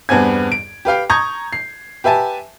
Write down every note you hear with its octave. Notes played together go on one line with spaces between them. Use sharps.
E2 G2 B3 C4 G#5 G#6
D7
G4 B4 F5 G5
A#5 C#6 D#6 G6 G#6
C7
G4 B4 E5 G#5 A5